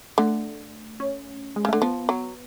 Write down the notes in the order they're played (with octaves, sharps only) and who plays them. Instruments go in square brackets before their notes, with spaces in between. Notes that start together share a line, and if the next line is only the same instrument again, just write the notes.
[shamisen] D3 [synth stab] A3
[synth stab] C#4
G#3
[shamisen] C#3
[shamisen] D3 [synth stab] A3
[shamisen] F3 [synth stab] B3
[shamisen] F#3